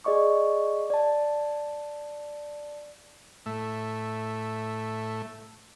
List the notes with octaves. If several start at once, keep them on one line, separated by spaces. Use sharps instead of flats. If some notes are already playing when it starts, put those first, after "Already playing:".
G#4 D5 D#5 C#6 D6
D5 A5
A2 A3 E5